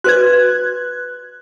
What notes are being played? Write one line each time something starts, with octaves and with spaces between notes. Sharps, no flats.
F#4 B4 D5 F#6 G#6